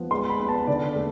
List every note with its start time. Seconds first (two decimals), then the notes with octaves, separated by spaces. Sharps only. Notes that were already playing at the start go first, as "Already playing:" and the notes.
Already playing: F3 B3
0.11 G#3 C6
0.30 B5
0.40 B3
0.49 A5
0.67 D3 D5
0.96 A3